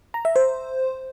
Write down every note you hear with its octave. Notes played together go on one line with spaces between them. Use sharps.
A#5
E5
C5